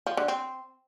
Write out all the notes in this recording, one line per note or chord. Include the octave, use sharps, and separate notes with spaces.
F3
D3
C4